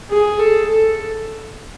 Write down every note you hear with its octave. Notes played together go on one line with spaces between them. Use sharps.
G#4
A4
A4